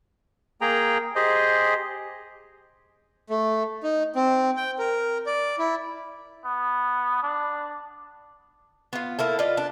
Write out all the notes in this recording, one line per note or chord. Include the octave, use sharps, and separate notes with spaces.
A#3 G#4 G5 A#5
G4 G#4 C5 D#5
A3
D#4
C4
G5
A#4
D5
E4
B3
D4
B3 F4
A#3 E4 A4
F4 B4 D5 D#5
D4